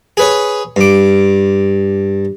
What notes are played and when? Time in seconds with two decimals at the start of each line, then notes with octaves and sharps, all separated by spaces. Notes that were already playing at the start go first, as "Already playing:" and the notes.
0.17 G#4 B4 C#5
0.76 G2 D6